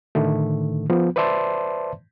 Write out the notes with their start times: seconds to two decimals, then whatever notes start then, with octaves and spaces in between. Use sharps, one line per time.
0.15 A2 D3 D#3 A3
0.90 F3 B3
1.16 B4 C5 D5 E5 A5 C6